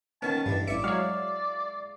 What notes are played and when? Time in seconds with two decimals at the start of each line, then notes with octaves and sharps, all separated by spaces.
0.22 D#3 B3 C#4 A5
0.46 G2 E3 G#3
0.67 A1 E4 D5 E5 C#7
0.84 F#3 G#3 C#5 F5 C7